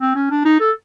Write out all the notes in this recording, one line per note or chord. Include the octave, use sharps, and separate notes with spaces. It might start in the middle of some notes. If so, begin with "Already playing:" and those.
C4
C#4
D4
D#4
A4